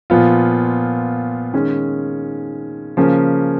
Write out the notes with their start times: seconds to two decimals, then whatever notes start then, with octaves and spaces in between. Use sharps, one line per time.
0.10 A#2 F3 B3 F4
1.54 D#3 G#3 C#4
2.97 C#3 F3 A#3 C#4